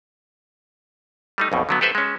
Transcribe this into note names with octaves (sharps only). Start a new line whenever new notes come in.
G3 A3 D#4
B1 F2 B2
D3 F#3 B3
G4 A4 B4 C5 E5
G#3 C#4